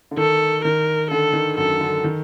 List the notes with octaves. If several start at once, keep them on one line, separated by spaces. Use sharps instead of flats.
D3
D#3 A4
D#3 A#4
D3 A4
D#3
F#2 F#3 A4
D3
D#3